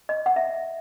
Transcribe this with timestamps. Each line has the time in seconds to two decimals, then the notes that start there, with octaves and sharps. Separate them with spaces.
0.09 D#5
0.26 F#5
0.36 E5